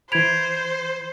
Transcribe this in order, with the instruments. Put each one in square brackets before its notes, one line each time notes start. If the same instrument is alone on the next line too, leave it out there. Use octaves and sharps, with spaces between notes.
[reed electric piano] E3 B5 [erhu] C5 [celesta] G#6 D7 F7